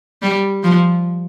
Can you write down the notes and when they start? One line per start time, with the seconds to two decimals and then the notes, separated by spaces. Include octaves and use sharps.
0.23 G3
0.63 F3